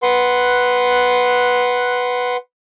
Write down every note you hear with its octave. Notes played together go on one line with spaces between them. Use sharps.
B4 F#5 C6